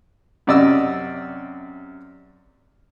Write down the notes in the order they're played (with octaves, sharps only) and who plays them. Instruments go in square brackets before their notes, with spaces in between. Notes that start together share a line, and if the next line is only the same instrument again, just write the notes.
[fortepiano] F#2 C3 D5 D#5 E6